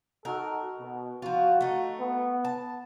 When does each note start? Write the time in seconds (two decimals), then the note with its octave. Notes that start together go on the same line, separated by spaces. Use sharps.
0.25 D#4 F#4 A4 A#4
0.79 B2
1.22 F3 F4 F#4
1.61 A3 D#4
2.00 B3
2.45 A5